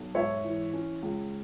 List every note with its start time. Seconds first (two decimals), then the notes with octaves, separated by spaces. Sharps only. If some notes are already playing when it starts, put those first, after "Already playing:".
Already playing: B1
0.14 G#2 C#5 E5
0.44 E3
0.73 C#4
1.03 C#2